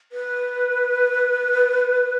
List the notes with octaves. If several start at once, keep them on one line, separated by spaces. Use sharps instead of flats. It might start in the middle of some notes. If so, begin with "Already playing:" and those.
B4